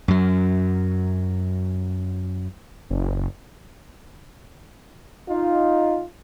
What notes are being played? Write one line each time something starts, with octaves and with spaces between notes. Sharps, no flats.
F#2 F#3
F#1
D#4 F4